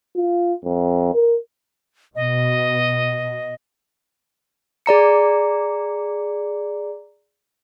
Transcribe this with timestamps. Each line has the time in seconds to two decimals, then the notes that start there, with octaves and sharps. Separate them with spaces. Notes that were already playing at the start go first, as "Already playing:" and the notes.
0.17 F4
0.65 F2
1.14 A#4
2.15 B2 D#5
4.86 G#4 D5 A#5 C#7